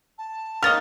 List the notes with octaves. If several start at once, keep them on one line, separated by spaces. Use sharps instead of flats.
A5
A#3 C#4 D#4 D#6 F6 A6 F7